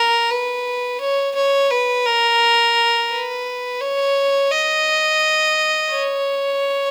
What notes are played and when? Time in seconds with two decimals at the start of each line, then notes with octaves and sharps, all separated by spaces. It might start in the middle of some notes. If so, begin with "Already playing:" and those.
Already playing: A#4
0.30 B4
1.01 C#5
1.36 C#5
1.71 B4
2.06 A#4
3.11 B4
3.81 C#5
4.51 D#5
5.91 C#5